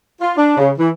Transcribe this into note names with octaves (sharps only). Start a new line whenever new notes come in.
F4
D4
C#3
E3